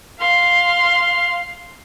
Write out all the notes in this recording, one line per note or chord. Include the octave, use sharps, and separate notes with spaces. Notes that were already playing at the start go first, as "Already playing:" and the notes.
F5 C6